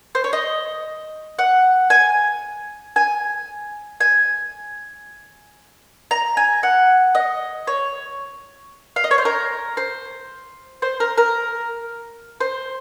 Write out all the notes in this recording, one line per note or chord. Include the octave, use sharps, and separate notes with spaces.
C5
C#5
D#5
F#5
G#5
G#5
G#5
A#5
G#5
F#5
D#5
C#5
F5
D#5
C#5
C5
A#4
C5
C5
A#4
A#4
C5